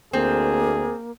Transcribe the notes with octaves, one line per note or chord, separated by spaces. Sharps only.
D2 A#3 C4 G#4